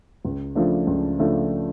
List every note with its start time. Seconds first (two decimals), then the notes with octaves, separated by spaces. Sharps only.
0.25 C#2
0.55 C#3 F3 A3 D4
0.87 C#2
1.19 C#3 F3 A3 D4